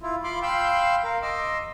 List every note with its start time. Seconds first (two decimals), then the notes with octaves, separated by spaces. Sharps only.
0.01 E4 F4
0.24 F4 B5 C6 D6
0.43 F5 G5 B5 C6 E6 G6
1.04 A#4 F5
1.22 D#5 C6 D6 E6